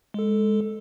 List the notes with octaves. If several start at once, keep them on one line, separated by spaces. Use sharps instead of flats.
G#3 A4